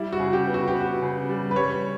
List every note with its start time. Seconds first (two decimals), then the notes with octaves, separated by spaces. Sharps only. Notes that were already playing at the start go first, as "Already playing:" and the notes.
Already playing: G3 E4
0.13 F#4
0.20 C#3
0.33 G4
0.47 B3
0.54 F#4
0.68 G4
0.74 B3
0.81 F#4
1.02 C#3
1.29 G3
1.51 B4
1.56 G3 C#5